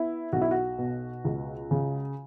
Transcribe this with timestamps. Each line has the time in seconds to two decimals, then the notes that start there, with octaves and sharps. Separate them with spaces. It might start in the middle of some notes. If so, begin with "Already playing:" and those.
Already playing: B3 E4
0.32 B1 F#4
0.41 E4
0.51 F#4
0.78 B2
1.25 C#2
1.71 C#3